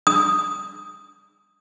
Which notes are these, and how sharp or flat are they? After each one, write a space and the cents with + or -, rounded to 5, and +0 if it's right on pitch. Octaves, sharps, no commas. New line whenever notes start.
D#6 +0